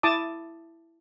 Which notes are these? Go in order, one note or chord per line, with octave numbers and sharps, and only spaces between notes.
E4 A5 D6 D#6